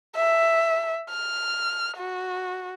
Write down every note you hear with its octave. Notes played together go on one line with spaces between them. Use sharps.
E5
F6
F#4